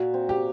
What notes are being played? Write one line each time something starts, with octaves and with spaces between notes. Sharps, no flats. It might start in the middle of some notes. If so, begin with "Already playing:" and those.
Already playing: A#2 F#4
C4
G4